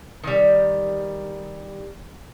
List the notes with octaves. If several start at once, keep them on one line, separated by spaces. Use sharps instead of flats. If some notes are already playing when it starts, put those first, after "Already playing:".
D#3 G3